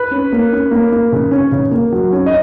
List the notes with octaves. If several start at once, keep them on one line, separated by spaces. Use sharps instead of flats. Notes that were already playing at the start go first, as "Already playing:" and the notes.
Already playing: B4
C#4
A#3
C#4
A#3
A#3
C#3
C#4
C#3
A#3
F#3
C#4
D#5